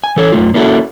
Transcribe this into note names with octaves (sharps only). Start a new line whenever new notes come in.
G#5
E3 A4 C#5
F#2 D#3 A3 F4
A#3 C#4 E4 F#4 A4